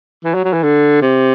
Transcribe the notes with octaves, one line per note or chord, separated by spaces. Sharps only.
E3
F#3
F#3
E3
D3
C3